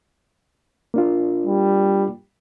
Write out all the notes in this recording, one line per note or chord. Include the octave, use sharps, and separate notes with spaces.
A#3 D4 F4
G3